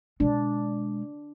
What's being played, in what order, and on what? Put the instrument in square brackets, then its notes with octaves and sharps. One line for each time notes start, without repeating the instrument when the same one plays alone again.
[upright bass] B2 G#3 [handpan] D4